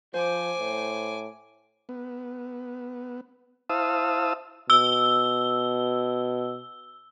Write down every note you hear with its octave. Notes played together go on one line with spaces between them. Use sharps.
F3 C5 G#5 D6
A2
B3
E4 C5 F5 A5 D#6 E6
B2 E6 G7